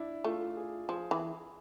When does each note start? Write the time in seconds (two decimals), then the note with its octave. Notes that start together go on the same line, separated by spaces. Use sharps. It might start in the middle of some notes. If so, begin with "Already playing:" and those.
Already playing: D4 E4
0.24 A3 F4
0.57 G#4
0.89 F3 G#4
1.11 E3